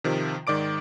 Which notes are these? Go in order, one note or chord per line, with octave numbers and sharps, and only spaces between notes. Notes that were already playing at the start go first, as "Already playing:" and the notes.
C3 D#3 F3
G#2 D#3 D5 D6 D7